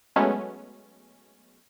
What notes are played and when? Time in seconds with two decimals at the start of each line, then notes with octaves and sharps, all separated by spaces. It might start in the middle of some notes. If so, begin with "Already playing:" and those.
0.16 F#3 G#3 A3 B3 C#4